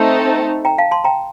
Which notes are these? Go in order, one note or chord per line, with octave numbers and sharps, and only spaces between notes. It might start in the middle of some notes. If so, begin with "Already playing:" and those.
Already playing: A3 C4 D#4 A4 G5
G5 A#5
F5 A5
A5 C6
G5 A#5